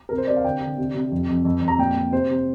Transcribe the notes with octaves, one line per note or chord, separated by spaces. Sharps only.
C3 A#4
C5
C3 D5
F5
D3 G5
D3
C3
C3
F2
F2
F2
F2
A#5
A#2 G5
A#2
C3 C5
C3